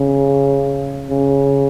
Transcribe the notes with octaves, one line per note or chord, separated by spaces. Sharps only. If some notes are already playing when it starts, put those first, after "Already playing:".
Already playing: C#3
C#3